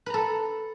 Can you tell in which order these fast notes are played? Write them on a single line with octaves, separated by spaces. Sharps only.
B4 A#5 A4